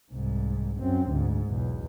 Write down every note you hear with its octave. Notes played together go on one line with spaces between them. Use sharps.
C2 G#2
F#2 C4
D2 G#2
B1 E2